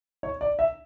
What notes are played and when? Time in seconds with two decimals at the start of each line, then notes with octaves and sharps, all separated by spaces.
0.23 C#5
0.41 D5
0.59 E5